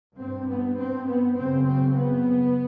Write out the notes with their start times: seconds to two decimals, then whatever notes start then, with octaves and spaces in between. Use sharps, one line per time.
0.17 G2 C4
0.47 B3
0.77 C4
1.07 B3
1.36 F#2 C#3 C4
1.65 C4
1.96 B3